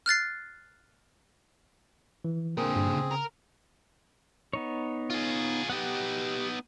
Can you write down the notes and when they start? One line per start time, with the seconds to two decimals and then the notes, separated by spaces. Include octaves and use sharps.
0.06 F6 F#6 A6 C7
2.25 E3
2.57 A#2 D3 C4 G#4 A#4
2.76 G2
2.89 C#3
3.11 A#4
4.53 B3 D#4 C#5
5.10 F4 G#4
5.70 B3 D#4 G4 F#5